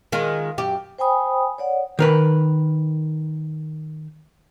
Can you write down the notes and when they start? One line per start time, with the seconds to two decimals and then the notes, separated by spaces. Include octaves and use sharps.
0.12 D#3 G#3 F4
0.58 F#2 G4
0.98 C5 G5 G#5 B5 D#6
1.58 C#5 D5 F#5
1.99 D#3 A#4 B4